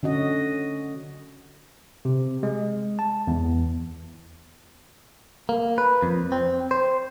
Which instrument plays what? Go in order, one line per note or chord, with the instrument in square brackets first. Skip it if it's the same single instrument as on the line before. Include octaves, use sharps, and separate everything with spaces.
[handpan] D3 C#4 F#4 D#5
[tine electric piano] C3
G#3
A5
E2
[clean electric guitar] A#3
B4
F2
C4
C5